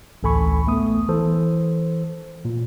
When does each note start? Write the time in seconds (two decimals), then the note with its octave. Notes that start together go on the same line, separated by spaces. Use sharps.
0.23 A1 D2 A4 G#5 B5 C#6
0.67 A3 B3 D#6
1.09 E3 A4 C5
2.45 A#2